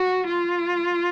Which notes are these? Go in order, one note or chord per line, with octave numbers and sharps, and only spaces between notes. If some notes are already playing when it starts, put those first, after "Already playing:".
Already playing: F#4
F4